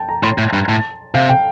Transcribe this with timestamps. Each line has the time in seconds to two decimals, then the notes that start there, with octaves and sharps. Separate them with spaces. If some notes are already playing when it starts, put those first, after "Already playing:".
Already playing: G5 A5
0.09 A#5
0.23 A2 C6
0.38 A2
0.53 G2
0.68 A2 A5
1.14 C3 F5
1.29 G5